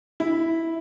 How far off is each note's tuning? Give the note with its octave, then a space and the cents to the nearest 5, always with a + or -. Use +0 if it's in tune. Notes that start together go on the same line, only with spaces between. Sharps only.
E4 -5